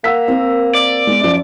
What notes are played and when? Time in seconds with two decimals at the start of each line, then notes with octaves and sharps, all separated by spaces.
0.04 A#3 F#5 E6 B6
0.28 C4 A#4
0.75 D5
1.07 G#3 B3
1.21 F#2 F3